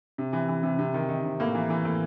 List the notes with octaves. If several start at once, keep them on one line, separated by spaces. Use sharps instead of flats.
C3
E3
E3
C3
C3
D#3
D#3
C3
A2 A#3
E3
E3
A2